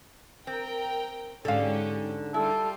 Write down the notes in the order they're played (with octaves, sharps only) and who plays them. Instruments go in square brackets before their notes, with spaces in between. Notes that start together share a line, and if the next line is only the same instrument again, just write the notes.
[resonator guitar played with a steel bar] C4 [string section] A#4 G5
[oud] G#2 D3 [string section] C#4 G4 [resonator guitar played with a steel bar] A4 F5
[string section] G3 F4 [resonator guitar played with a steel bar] E4 [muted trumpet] A4